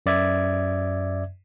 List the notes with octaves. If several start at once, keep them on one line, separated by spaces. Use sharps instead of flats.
F#2 D5 E5 G#6